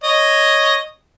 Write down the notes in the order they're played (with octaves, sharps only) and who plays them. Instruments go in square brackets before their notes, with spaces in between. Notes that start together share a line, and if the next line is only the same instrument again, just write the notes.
[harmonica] C#5 D#5